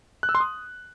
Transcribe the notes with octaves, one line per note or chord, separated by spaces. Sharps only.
F#6
E6
C6
D#6